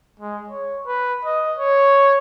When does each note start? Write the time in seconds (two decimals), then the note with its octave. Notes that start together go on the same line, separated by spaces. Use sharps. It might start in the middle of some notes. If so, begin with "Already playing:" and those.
0.20 G#3
0.49 C#5
0.87 B4
1.25 D#5
1.58 C#5